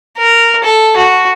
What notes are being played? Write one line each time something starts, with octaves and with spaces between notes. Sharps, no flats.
A#4
A4
F#4